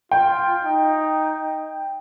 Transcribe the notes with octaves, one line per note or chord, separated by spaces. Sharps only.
F4 G5
D#4